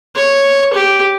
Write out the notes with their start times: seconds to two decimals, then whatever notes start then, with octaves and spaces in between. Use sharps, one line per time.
0.16 C#5
0.73 G4